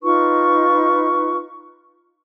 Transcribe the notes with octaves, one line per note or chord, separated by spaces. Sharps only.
D#4 F4 B4 C#6